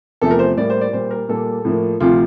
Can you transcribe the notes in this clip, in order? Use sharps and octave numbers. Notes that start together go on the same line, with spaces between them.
E2 C3 F3 A3 A4
A#4
C5
A2 G3 A#3 D5
C5
D5
A#2 G3 A#3 C5
A#4
A#2 G3 A#3 A4
A2 F3 A#3
D2 C3 F3 F4